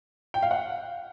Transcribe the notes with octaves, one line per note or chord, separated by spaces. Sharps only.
G5
F5
F#5